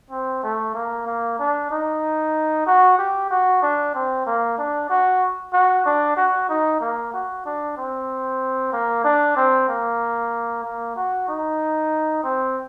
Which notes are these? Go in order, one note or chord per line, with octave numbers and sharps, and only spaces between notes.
C4
A3
A#3
A#3
D4
D#4
F#4
G4
F#4
D4
C4
A#3
D4
F#4
F#4
D4
F#4
D#4
A#3
F#4
D4
C4
A#3
D4
C4
A#3
A#3
F#4
D#4
C4